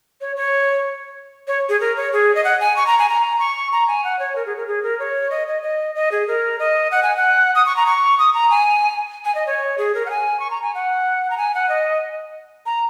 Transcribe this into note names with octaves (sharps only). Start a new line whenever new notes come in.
C#5
C#5
C#5
G#4
A#4
C#5
G#4
D#5
F#5
G#5
C#6
A#5
G#5
A#5
C#6
A#5
G#5
F#5
C#5
A#4
G#4
A#4
G#4
A#4
C#5
D#5
D#5
D#5
D#5
G#4
A#4
D#5
F#5
G#5
F#5
D#6
C#6
A#5
C#6
D#6
A#5
G#5
G#5
D#5
C#5
G#4
A#4
F#5
G#5
C#6
A#5
G#5
F#5
A#5
G#5
F#5
D#5
A#5